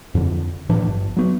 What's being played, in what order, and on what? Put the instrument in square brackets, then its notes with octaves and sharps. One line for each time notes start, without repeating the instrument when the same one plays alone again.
[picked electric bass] F2 D3
A2 E3 F3 D4
G1
F#3 B3